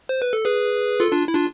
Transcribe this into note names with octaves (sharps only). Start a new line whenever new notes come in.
C5
B4
A4
G#4 B4
F4 A4
D4 F4
E4
D4 F4